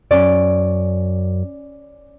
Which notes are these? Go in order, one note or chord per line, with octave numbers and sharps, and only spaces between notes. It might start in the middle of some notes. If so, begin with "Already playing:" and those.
F#2 C#4 D5